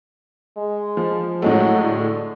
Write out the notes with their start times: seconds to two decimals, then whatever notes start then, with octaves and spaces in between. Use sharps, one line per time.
0.57 G#3
0.97 F3
1.42 A2 F#3 G#3 A3
1.81 D3